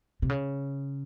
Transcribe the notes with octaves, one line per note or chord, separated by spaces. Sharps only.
C3
C#3